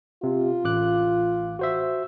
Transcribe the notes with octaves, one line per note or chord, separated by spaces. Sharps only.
C3 F4
A1 D6 F#6
F#4 C5 E5